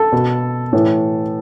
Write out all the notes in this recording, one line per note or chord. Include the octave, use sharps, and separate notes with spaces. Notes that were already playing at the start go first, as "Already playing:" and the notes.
Already playing: A4
B2
A2 E3